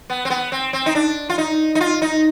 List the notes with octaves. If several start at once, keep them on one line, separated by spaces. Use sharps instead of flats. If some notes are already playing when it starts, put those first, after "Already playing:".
B3
C4
B3
C4
C4
D#4
D4
F4
D#4
D#4
F4
D#4